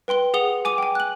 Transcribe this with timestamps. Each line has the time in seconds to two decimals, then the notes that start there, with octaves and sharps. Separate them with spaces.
0.08 B4 G5 C6 G7
0.34 G#4 F#5 D#6 F7 G7
0.65 G#5 D6 D#7
0.78 G5 G#5
0.95 F#6 F#7